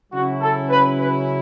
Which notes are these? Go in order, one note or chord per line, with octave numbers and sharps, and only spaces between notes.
C#3 F#3 C#4 E4 F#4
A4
B4
B4